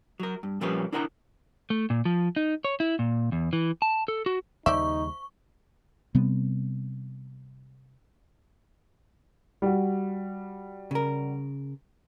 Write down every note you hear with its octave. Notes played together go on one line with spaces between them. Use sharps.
F#3 A#4
G2
A#2 F3 G3 A#3 C#4 B4
D4 E4 A#4 F#5 G#5 A#5
A3
A#2
F3
D#4
C#5
E4
A#2
E2
E3
A5
A4
F#4
D#2 C#3 G3 D#4 C5 D5 E5 C#6
C3 G3 B3 C4
G3 F#4
C#3 A#4